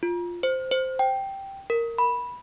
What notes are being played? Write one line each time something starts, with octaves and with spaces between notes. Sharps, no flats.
F4
C5
C5
G5
A#4
B5